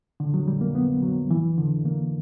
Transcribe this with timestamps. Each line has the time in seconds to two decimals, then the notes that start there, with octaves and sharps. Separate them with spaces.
0.20 D3
0.34 F#3
0.48 G3
0.61 A#3
0.75 B3
1.03 F#3
1.31 E3
1.58 D3
1.85 A#3